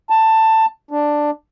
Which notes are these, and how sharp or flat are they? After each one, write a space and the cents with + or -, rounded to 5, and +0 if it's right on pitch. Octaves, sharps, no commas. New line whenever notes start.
A5 +15
D4 +5